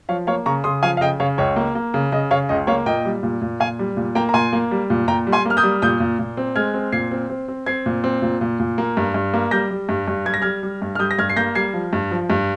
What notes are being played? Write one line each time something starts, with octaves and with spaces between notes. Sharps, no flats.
F3 C#5 F5
A#3 C#5 F5
C#3 A#5 C#6
C#3 C6 D#6
F3 F5 G#5
F5
C#3 D#5 G5
C#3 C#5 F5
C#2 C#5
A#3
A#3
C#3
C#3 D#5
C#3 C#5 F5
C#2 D#5
A#3 C#5 F5
A#2 D#5 G5
G3
A#2
A#2
A#2 F5 G#5
G3
A#2
A#3 G5 A#5
A#5
A#2 G#5 C6
A#3
G3
A#2
A#2 G5 A#5
G3
G#5 C6
A#3 F6
D#6 G6
G3
A#2 D#6 G6
A#2
A#2
C4
G#3 F6 G#6
C4
A#2 G#6 C7
C4
C4
C4
C4 G#6 C7
A#2
C4
A#2
A#2
A#2
A#3
G2
G2
A#3
G3 G6 A#6
G3
G2
G2
G3 G#6
A#6
G3 F6 G#6
G3
G2
F6
G3 D#6 G6
A#6
G2 F6 G#6
C7
A#3 G6 A#6
G3 G#6 C7
F3
G2
F3
G2